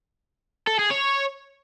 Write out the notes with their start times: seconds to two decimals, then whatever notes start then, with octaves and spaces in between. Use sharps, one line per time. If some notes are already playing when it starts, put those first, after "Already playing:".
0.67 A4
0.79 G#4
0.91 C#5